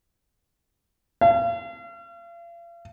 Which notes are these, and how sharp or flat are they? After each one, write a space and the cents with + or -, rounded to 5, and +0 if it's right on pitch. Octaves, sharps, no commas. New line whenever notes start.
F5 -40